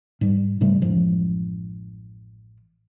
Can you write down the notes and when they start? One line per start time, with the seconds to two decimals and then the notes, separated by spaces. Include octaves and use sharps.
0.21 G#2 G3
0.61 G#2 C#3 G3 A3
0.82 A1 F#2 F3 G#3